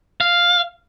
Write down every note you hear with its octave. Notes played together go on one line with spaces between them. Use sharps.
F5